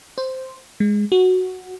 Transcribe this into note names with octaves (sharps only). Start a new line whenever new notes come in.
C5
G#3
F#4